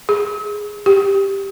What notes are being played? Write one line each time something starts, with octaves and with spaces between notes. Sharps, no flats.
G#4
G4